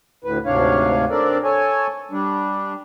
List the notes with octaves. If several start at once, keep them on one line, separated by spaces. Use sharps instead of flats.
D2 A2 B4
D2 G#2 C3 D4 C#5 F5
C4 D4 A4 A#4 D5
A4 C#5 G#5
G3 D4